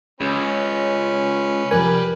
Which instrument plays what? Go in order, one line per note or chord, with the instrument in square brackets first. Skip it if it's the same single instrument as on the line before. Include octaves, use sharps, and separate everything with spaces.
[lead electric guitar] C#2 [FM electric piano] C#3 [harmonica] C#4 B4
[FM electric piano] F2 C3 G#5 [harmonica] G3 B4 D5 [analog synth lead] A#4